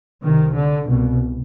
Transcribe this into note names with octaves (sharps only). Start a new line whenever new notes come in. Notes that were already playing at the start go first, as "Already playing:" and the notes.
C2 C3 D#3
D3
C2 B2